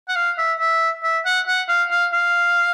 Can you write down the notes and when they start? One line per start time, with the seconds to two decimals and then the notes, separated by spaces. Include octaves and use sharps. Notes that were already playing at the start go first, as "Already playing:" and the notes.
0.09 F#5
0.16 F5
0.38 E5
0.60 E5
1.03 E5
1.25 F#5
1.47 F#5
1.69 F5
1.91 F5
2.13 F5